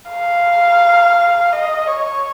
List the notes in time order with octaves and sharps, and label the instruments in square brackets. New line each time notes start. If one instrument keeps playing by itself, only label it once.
[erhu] F5
D#5
C#5